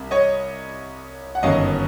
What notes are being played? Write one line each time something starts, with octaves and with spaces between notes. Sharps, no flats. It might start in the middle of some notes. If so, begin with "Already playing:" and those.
Already playing: C2
C#5 D#5
F#5
G1 F#2 D#3 F#3 D#5 F5